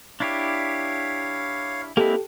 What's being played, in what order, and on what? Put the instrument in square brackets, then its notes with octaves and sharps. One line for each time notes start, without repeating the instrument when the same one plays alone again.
[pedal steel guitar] D4 E4 G4 [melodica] C#5 F5
[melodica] G#3 [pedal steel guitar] A#3 C4 E4 [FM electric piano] G4 A4